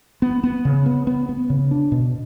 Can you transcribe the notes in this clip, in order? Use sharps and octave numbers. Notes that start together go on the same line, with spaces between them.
B3
B3
C#3
B3
B3
B3
C#3
D4
B2